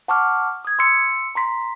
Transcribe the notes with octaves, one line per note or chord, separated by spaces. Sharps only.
F#5 A5 C#6 D6 F6
D#6 G#6
C6 E6 C#7
A#5 C6 B6